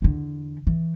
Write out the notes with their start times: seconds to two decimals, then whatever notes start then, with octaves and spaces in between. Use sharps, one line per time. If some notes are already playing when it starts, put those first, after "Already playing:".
0.02 E2 D3
0.67 E3